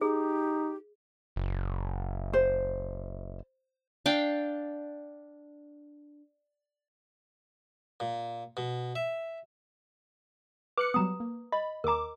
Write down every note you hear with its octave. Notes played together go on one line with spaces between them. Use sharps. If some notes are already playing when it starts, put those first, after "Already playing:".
D#4 G4 G#4
F#1
C5
D4 F5 G5
A#2
B2
E5
B4 D6 F#6 C#7
F#3 G3 B3 A#5 D#6
A#3
D#5 B5
D#2 A#4 A#5 D6